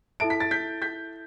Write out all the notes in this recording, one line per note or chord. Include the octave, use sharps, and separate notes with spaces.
E4 A4 E5 A5 D7
B6
A6
G6 B6
G6 B6